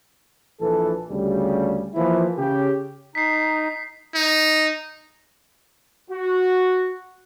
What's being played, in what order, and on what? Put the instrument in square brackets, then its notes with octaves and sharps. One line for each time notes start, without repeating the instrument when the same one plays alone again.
[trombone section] A#1 E3 A4
D2 C#3 G3
E3 F3 A#3 E4
C#3 G4
[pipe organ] D#4 [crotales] B6 C7
[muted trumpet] D#4
[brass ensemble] F#4